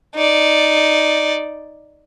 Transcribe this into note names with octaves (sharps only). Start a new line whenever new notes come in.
D#4 D5